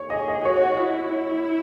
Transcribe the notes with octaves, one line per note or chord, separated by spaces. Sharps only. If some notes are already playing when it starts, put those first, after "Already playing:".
Already playing: C#5
G#4 D#5
D#5
F#4 C#5
E4